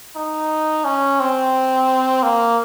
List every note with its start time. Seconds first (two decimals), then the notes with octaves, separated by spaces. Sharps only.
0.16 D#4
0.85 C#4
1.20 C4
2.23 A#3